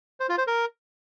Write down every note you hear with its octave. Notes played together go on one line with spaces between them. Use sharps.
C5
F4
C5
A#4